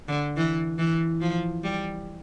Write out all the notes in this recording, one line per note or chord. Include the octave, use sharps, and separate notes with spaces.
D3
E3
E3
F3
G3